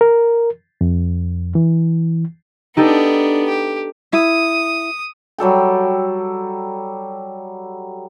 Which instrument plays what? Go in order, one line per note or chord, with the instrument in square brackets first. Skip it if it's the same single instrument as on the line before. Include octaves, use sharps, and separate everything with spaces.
[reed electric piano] A#4
F2
E3
[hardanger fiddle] B3 D4 [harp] D#4 G4 A4
[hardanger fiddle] G4
[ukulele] E4 [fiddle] D#6
[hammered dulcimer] F#3 G3 A4 G5